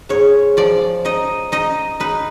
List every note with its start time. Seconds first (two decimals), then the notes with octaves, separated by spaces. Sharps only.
0.09 G#2 C#5
0.57 F3 D5
1.05 D#4 D#5
1.52 D#4 D#5
2.00 D#4 B4